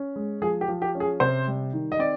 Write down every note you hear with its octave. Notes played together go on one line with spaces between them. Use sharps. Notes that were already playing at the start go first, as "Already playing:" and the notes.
Already playing: C#4
G#3
F3 G#4
G4
F3
G4
C#4
G#4
C3 C5
G3
D#3
D#5
C4 D5